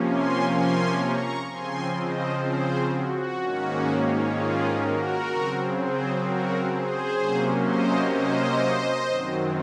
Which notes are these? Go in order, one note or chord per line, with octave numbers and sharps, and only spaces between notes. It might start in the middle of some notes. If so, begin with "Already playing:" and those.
Already playing: C3 F3 A#3 C#4
G#5 C6
G#5 C6
A#5 C#6
C#3 F3 C4 G#5 C6
C5 D#5
G#4 C5
F#4
G#2 D#3 A#3 C#4
F4 G#4
F#4 A#4
C#3 F#3 C4
G#4 C5
F#4 A#4
G#4 C5
C3 F#3 A#3 C#4
C5 D#5
C5 D#5
F#2 D#3 F#3 C4